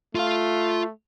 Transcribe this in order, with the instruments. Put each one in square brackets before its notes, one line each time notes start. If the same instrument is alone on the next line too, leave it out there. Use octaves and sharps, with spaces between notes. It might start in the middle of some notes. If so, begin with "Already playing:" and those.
[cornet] A3 [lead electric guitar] F4 F5